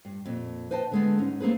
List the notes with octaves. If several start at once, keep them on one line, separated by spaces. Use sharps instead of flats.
G2
F2 A#2
B4 C5 D#5 G5 A5
D3 G#3 B3
G#2 C#4 D#4
A3 A#3 C4 G#4 B4